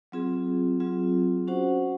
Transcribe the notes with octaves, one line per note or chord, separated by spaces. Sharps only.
F#3 C4 F4 G#4
F#3 C4 F4 G#4
C#4 F#4 C5 F#5